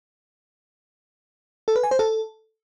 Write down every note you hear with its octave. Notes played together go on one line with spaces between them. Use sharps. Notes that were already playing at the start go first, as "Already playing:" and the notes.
A4
B4
G#5
C5
A4